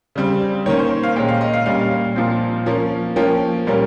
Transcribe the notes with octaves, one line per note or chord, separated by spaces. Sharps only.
C#3 G3 C4
D#3 A#3 C#4 C#5
C5
F5
A#2 G#3 C#4 G5
F5
D#5
F5
A#2 G3 C#4 F5
A#2 F3 C4
F3 A#3 C#4
F3 A#3 C#4 G5
A#2 G3 A#3 C#4